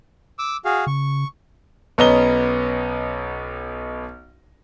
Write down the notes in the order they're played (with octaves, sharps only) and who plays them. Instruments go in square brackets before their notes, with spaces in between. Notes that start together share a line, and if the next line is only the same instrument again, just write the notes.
[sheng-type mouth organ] D6 E6
F#4 G#4 F5
[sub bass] C#3 [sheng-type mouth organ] C#6
[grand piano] B1 B3 C#4 D#5 A#5 G7